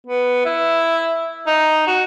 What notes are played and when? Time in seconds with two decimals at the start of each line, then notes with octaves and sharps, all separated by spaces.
0.07 B3
0.45 E4
1.47 D#4
1.87 F#4